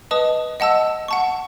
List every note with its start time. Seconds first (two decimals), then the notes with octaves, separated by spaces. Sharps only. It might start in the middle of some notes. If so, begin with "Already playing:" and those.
0.11 B4 D#5 A5 D#6
0.60 D#5 F#5 A5 E6
1.08 F#5 A5 C#6